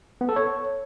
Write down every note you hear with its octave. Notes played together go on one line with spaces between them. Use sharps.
B3
A4
C#5